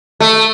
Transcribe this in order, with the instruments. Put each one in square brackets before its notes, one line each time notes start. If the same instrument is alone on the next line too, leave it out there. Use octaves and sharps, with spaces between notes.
[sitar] A3